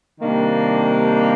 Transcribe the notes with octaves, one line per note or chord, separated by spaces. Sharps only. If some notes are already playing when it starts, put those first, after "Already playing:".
C3 D#3 G3 A#3 D4